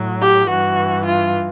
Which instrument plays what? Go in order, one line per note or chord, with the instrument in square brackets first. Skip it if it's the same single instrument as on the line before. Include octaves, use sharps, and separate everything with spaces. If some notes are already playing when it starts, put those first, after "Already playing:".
Already playing: [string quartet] A2 F#3
G4
G2 E3 F#4
F4